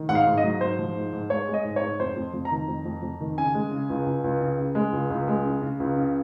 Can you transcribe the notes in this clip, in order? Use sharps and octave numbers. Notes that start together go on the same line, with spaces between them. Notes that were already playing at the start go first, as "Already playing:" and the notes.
Already playing: D#3
G#2 F#5
F5
G#2
D#5
F#3
G#2 C5
F3
G#2
G#2
G#3 C#5
G#3
D#5
G#2
C#5
G#2
F2 C5
F2
F2
A#5
D#3
F2
F2
F2
D#3
C#3 G#5
G#3
C#3
C#2
C#2
C#2
C#3
C#3
G#3
C#2
C#2
G#3
C#3
C#3
C#2
C#3